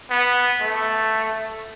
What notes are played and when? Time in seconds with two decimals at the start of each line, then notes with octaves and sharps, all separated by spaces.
0.10 B3
0.61 A3